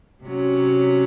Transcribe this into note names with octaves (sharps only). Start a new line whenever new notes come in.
C3 F#3 C#4